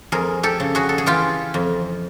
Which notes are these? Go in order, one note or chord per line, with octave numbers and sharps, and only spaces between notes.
F2 G#4 A#4
G4 A4
C#3
F#4 G#4
A4
G#4
E3 F4 G4
F2